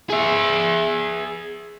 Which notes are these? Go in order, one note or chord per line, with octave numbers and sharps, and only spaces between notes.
G#4 E5